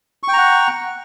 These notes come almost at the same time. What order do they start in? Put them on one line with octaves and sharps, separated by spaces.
C#6 G5 A#5 F#5